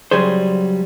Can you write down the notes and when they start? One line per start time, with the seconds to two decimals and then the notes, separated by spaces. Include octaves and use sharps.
0.11 C#3 F#3 G3 G#4 C5